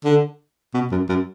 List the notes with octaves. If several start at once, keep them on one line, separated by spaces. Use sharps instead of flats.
D3
B2
F#2
F#2